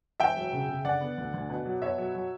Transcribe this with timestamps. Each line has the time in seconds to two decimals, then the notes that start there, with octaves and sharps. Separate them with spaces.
0.20 E1 E5 G5
0.37 F#3
0.53 C#3
0.69 C#3
0.85 D3 D5 F#5
1.01 B3
1.18 D2
1.34 D2
1.50 B2
1.66 F#3
1.82 B2 C#5 E5
1.98 F#3
2.15 F#3